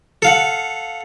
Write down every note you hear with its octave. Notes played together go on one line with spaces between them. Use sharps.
A4 F5 F#5